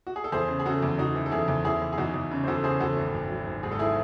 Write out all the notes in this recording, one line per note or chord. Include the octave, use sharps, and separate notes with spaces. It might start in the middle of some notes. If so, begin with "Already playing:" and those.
F#4
G#4
A4
E2 G#4 C5
C#3
G#4
C#3 F#4 A4
E2
E2 D#4 F#4
E3
A4
E2 E4 G#4
E2
E2 E4 G#4
E2
G#4
E2 D#4 F#4
E2
C#3
C5
E2 F#4 A4
C#3 G#4 C5
E2 F#4 A4
G#1
G#1
F#3
G#1
G#2 G#4
A4
E4 G#4